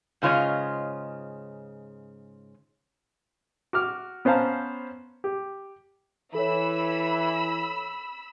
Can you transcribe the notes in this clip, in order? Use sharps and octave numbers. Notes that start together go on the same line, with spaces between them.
G#2 C#3 F4 C#5 D#5
F#4 D6 F6
B3 C#4 C5 F5 A5 A#5
G4
E3 A4 C#5 B5 E6